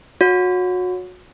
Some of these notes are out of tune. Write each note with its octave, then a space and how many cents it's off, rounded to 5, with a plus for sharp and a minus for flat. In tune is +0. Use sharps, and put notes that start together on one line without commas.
F#4 -30 C#5 +10